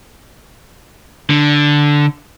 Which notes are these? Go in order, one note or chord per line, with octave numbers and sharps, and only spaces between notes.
D3